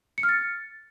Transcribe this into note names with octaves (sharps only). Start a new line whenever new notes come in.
C#7
F6
A6